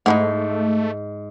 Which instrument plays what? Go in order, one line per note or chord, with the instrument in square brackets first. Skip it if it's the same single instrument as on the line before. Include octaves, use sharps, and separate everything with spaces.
[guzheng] G#2 [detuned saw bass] A3 [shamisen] D#4 E4 F#5